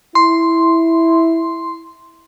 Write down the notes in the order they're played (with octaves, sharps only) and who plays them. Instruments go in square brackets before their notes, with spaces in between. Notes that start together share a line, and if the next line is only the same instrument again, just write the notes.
[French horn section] E4 [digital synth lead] C6